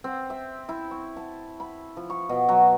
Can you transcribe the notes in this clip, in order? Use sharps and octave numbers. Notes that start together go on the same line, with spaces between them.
C4
E5
E4
C#6
A5
B5
F3
C#6
B2
F#3